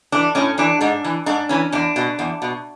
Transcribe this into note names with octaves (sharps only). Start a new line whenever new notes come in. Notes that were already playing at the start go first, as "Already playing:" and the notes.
E3 D4
A2 C#4
E3 D4
G#2 D4
E3
G#2 D4
E3 C#4
E2 D4
B2
E2
B2